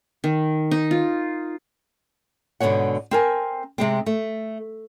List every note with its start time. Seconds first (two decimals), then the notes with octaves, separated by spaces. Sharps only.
0.24 D#3
0.71 D#4
0.91 F4
2.60 G#2 B2 D3 A3 C#5 F#5
3.11 C4 A#4 G#5
3.78 C3 G#3 C4
4.06 A3